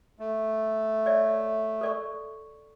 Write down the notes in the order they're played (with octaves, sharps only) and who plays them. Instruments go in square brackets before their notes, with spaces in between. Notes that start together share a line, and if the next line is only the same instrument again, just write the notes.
[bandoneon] A3
[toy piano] C#5 D5 E5
A4 D5 C#6